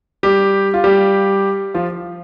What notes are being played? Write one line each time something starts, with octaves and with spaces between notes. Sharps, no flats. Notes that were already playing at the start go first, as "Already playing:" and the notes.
G3 G4
F4
G3 G4
F3 F4